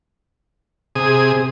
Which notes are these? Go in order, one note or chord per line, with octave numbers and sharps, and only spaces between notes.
C3 G#4 D#6